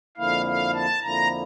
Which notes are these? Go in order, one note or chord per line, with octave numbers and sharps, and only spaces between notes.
F2 D3 F3 A#3 E4 F5
F5
A5
F2 D3 F3 A#3 E4 A#5